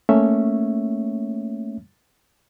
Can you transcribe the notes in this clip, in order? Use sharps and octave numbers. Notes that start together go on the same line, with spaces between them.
A3 A#3 C#4 C#5 E5